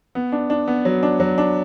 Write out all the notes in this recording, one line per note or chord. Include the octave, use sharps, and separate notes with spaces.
B3
D4
D4
B3
F#3
D4
F#3
D4